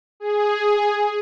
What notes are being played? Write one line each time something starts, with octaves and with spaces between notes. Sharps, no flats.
G#4